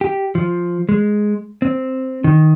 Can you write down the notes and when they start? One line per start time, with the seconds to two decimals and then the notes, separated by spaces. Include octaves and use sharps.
0.01 G4
0.35 F3
0.89 G#3
1.62 C4
2.24 D#3